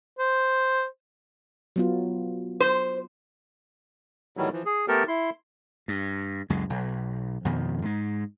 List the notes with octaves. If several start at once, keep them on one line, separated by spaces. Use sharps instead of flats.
C5
F#3 B3 F4
C5
A2 D#3 E3 F#3 G3
E3 F3
G#4
A3 B3 G4 A4 A#4
E4 C6
G2
C#2 F#2 G#3
B1
F2 B2 D#3
G#2 G#3